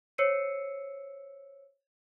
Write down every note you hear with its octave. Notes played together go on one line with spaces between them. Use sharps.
C5 C#5 E6 C7 C#7 D#7